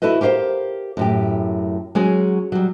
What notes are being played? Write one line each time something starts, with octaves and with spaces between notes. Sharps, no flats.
E4 F#4 A4 B4 D#5
G4 A#4 C5 E5 F5
F#2 A2 G4
F#3 G#3 C#4 F#4 G#4
F#3 G3